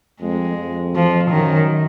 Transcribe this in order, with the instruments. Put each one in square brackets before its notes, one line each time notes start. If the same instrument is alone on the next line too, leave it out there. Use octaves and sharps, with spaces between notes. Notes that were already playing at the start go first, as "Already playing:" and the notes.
[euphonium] F2 [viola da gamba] G#3
[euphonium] F2
[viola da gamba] F3
[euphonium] F#2 [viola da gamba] D#3